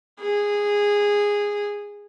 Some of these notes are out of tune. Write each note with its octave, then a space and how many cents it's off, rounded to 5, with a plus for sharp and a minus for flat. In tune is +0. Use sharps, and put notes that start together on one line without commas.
G#4 -10